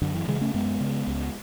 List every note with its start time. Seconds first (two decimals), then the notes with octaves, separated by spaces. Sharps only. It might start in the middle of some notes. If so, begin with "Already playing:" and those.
0.02 F#2 D3
0.15 E3
0.28 C#3 E3 G#3
0.41 A3 C#4
0.54 F#2 G#3 B3
0.80 C#3
1.07 C#2